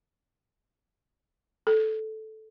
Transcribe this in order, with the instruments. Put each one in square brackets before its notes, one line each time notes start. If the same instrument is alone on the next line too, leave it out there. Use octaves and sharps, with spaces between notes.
[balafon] A4